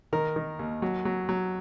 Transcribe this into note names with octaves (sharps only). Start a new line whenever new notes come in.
D#3 A#4
D#3
D#2
F#3
F#3
F#3